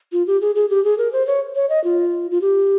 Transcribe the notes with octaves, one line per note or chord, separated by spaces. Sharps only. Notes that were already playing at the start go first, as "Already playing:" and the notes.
F4
G4
G#4
G#4
G4
G#4
A#4
C5
C#5
C#5
D#5
F4
F4
G4